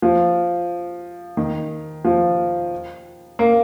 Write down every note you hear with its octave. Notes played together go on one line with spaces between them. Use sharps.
F3
D#3
F3
A#3